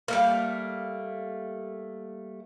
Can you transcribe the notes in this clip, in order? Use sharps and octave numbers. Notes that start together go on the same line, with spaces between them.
G3 A3 A#3